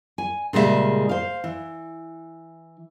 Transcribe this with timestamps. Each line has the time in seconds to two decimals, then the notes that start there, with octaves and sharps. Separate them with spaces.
0.18 G#5
0.53 A#2 C#3 G3 G#3 C5 E5
1.09 C5 F5
1.44 E3